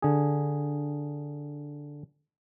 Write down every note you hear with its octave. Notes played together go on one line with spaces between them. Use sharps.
D3 G#4